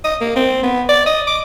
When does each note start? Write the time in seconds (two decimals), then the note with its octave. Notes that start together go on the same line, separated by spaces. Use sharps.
0.04 D#5
0.21 A#3
0.36 C4
0.63 B3
0.88 D5
1.06 D#5
1.27 D6